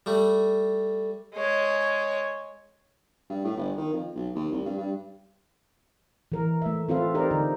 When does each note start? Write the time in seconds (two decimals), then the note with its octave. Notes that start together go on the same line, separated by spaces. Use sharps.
0.06 G3 A3
1.35 G#3 C#5
3.30 G2
3.45 A2
3.57 G1
3.77 D#3
3.93 F2
4.16 B1
4.35 D#2
4.51 C2
4.65 G2
4.78 G2
6.32 E3 A#4
6.62 A3 E5
6.89 C4 F4 A4 B4 F5
7.14 D#4 G4 A#4 C5 D5
7.31 D3 D#4